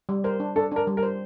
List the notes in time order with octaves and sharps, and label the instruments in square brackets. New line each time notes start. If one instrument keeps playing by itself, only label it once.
[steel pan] G3
[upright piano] A#4 [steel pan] C5
[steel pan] D4
[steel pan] D4 [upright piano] A4
[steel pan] D4 [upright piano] A#4
[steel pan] G3
[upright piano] A#4
[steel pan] C5